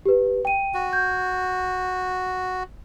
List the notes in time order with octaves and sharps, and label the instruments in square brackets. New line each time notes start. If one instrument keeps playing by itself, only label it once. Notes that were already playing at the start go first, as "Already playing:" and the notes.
[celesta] G4 B4
G5 D#7
[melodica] F#4
[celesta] G6